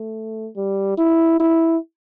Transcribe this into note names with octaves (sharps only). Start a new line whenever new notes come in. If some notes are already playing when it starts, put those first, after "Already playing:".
Already playing: A3
G3
E4
E4